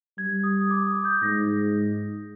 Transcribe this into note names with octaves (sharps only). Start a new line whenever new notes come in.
G3 G#6
D#6
D6
D#6
G6
G#2 A#6